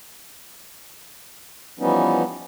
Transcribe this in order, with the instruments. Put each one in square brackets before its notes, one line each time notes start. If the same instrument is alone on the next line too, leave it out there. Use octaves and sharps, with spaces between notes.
[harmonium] E3 F3 G3 B3 C#4 D#4